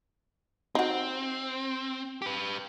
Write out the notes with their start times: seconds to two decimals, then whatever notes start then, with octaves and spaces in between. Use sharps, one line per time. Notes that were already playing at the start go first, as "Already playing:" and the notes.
0.75 C4 D#4 F#4
2.22 G4 B4